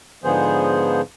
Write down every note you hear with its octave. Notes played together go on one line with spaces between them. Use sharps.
G#2 D3 F3 B3 G#4 C5